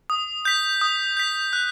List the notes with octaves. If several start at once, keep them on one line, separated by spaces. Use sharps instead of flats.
D#6
G6 B6
D#6
G6 B6
F#6